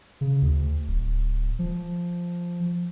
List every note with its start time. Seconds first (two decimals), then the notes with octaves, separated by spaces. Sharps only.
0.21 C#3
0.42 D2
0.88 D1
1.59 F3